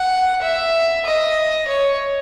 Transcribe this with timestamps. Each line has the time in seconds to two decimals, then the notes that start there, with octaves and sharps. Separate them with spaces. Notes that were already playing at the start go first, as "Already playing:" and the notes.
Already playing: F#5
0.42 E5
1.06 D#5
1.68 C#5